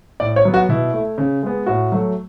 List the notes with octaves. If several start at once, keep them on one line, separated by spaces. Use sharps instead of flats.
A2 D5
C#5
F#3 B3
F#4
B2 E4
A3
C#3
G#3 B3
A2 F#4
F#3 A3